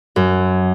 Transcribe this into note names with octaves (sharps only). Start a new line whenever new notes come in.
F#2